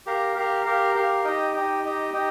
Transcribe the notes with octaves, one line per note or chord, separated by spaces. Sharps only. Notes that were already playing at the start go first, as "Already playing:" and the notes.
G4 A#4 F5
G4 A#4 F5
G4 A#4 F5
G4 A#4 F5
D#4 G4 D#5 G5
D#4 G4 D#5 G5
D#4 G4 D#5 G5
D#4 G4 D#5 G5